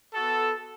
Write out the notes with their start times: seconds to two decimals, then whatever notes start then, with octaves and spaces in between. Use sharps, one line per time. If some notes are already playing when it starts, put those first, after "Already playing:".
0.14 B3 F#4 A4